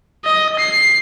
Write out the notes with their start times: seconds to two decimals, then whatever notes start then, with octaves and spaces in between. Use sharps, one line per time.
0.25 D#5
0.59 C7